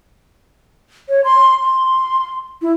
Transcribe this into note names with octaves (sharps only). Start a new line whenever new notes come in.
C#5
C6
C6
E4